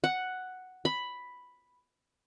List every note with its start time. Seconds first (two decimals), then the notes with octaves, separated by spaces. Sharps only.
0.04 F#5
0.85 B5